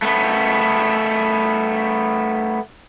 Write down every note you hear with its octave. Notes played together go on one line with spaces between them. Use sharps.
A3 B3